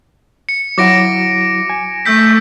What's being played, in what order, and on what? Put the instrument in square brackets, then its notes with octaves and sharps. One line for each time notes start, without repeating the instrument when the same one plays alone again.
[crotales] C#7
[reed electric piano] F#3 E4 F#4 [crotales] D6 A#6 D7
[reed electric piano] G#5
[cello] A3 [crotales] E6 G6 B6